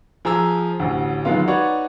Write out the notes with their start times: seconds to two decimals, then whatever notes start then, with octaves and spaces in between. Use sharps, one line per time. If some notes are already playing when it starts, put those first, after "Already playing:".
0.25 F3 G#4 A#5 E6
0.80 A1 D2
1.25 D#3 F#3 G#3 B3 F4
1.47 D#4 F#4 B4 C#5 D5